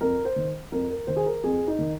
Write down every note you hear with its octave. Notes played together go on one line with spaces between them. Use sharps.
F2 A#4
C5
D#3
F2 A#4
A#4
D#3 C5
G#4
A#4
F2 G#4
D#4
D#3